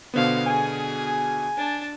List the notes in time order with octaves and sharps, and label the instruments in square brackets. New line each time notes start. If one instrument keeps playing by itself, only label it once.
[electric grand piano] B2 D3 B3 [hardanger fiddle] C5 F5
[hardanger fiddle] G#4 [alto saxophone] G#5
[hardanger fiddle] D4 A5